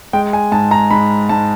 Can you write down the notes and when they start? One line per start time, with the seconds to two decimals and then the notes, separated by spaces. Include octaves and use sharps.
0.13 G#3 G5
0.33 G#5
0.52 G#2 A5
0.71 A#5
0.91 G#2 B5
1.29 G#2 A5